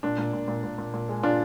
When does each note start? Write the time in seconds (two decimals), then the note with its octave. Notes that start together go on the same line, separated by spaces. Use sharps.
0.03 A#2 D4
0.18 A#2
0.33 A#2
0.48 A#2
0.64 A#2
0.78 A#2
0.94 A#2
1.09 G#3
1.23 A#2 D4 F4